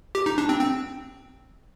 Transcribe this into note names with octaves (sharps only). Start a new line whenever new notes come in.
G4
D#4
D4
C4
C4